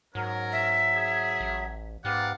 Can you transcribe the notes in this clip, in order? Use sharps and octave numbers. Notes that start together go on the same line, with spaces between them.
G#2 F#3 C#4 A#4
E5
G#4
A1
G#2 B3 G4 D5 F5 F#5